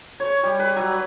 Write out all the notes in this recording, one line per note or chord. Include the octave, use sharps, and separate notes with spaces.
C#5
G3
B4
F#3